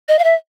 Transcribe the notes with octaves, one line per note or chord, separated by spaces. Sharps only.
D#5
F5
E5